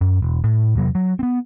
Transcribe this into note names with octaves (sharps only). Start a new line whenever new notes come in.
F#2
E1
A2
E2 C3 F#3
F#3
B3 C4